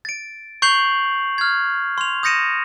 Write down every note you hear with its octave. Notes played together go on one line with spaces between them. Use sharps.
A6 D7
C#6 G6 C7 F7 F#7
F6 G#6
C6 F7
D#6 G6 A#6 C#7 D#7 E7